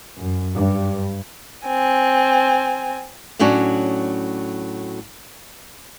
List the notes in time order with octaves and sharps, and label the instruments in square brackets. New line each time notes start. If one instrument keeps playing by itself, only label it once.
[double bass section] F#2
G2
[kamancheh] C4 G#5
[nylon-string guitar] A2 F#3 C#4 D4 F#4